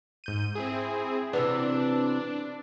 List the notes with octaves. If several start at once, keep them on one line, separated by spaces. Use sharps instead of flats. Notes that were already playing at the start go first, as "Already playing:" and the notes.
G#2 G6 D#7
C4 E4 G#4
C3 E3 B3 D4